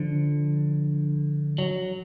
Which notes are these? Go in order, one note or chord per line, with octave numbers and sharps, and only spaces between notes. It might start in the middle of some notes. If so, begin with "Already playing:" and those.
Already playing: D3 F3
F#3